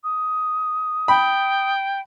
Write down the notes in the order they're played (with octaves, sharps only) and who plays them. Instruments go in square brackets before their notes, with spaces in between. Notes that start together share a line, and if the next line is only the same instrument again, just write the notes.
[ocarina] D#6
[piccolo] G5 [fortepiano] B5